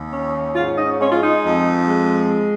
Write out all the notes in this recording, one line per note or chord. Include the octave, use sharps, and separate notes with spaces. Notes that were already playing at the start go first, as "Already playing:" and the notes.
Already playing: D#2
C#4
G#2 F4 F5
D#4 D#5
G#3 C#4 C#5
F4
D#4
F2
G#3